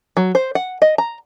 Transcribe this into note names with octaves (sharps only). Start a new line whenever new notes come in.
F#3
C5
F#5
D#5
A#5